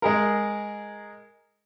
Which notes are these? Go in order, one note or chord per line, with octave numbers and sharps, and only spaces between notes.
G#3 G#4 A#4